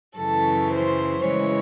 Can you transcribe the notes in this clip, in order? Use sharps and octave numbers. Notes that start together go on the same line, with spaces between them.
F#2 C#3 E3 A4
C5
C#3 E3 G#3 C#5